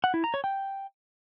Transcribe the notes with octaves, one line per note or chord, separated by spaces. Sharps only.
F#5
E4
A#5
C#5
G5